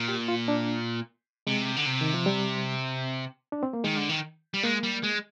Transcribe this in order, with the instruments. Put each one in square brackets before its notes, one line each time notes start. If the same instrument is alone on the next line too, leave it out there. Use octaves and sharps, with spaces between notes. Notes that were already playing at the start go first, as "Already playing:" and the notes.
Already playing: [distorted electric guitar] A#2
[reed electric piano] G4
F4
D4
[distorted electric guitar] C3 [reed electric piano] G#3
[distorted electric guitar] D3
C3
[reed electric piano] D#3
F3
G3
D4
C4
A#3
[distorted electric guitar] D#3 [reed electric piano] G#3
[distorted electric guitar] D3
D#3
G3
[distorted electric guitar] G#3 [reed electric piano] A#3
[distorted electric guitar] G3
G#3